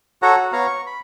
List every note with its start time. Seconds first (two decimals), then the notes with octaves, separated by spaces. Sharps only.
0.22 F#4 A4 C#5 F#5 A#5
0.36 F#4
0.53 B3 C#5 F5 A#5
0.67 C#6
0.87 B5